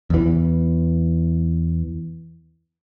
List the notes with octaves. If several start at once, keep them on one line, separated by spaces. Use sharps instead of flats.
E2 E3